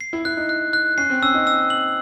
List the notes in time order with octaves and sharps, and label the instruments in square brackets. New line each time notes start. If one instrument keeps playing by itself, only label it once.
[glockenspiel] C7
[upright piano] E4
[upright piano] E4 [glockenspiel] F#6
[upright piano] D#4
[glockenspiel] F#6
F#6
[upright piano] C#4 [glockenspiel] C7
[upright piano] C4
[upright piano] C#4 [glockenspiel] E6
[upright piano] D#4
[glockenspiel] E6
F#7